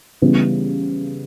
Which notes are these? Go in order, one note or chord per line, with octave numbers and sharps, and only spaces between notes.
C#3 E3 G3 B3